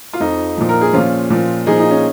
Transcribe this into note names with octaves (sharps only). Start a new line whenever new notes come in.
F4
F2 F3 D#4
A#2 F3
A#4
G#4
A#2 F3 C#4 F4
A#2 F3
A#2 F3 D#4 G#4
D#4
C#4